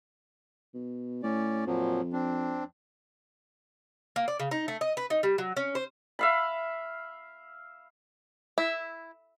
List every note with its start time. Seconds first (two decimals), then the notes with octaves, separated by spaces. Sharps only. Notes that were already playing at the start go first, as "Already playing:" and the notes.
0.74 B2
1.23 A2 C#4 D5
1.67 F2 A#2 F3 F#3
2.13 C4 D4
4.16 A#3
4.28 D5
4.40 C#3
4.51 D#4
4.68 A3
4.81 D#5
4.97 B4
5.10 D#4
5.23 G3
5.38 F#3
5.57 C#4
5.75 C5
6.19 E5 F5 B5
8.58 E4 E5